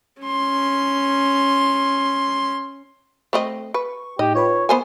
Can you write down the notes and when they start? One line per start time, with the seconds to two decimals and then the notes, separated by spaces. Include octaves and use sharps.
0.22 C#4 C6
3.33 A3 C4 D#5
3.74 B4 C#6
4.19 A2 D#4 G4 D#5
4.35 F4 B4 C#5 B5
4.69 B3 A#4 C5 G#5